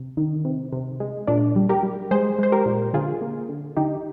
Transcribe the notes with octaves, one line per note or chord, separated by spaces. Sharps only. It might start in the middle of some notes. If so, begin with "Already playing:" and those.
Already playing: C3
D#3
C3
C3
G#3
A#2 D4
G3
G4 A#4
G3
G#3 G#4 C5
G#3 C5
G4 A#4
A#2
D3 F4 G#4
A#3
D3
D3 D#4 G4